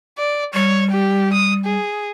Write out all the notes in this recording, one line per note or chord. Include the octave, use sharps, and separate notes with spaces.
D5
G3 C#5
G4
D#6
G#4